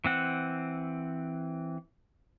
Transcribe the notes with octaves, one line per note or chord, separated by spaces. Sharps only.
E3 C4 F#5